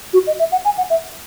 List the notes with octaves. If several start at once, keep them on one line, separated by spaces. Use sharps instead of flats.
F#4
D#5
E5
F#5
G#5
F#5
E5